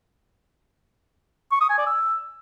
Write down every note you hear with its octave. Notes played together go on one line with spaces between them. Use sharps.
C#6
D#6
G#5
D5
E6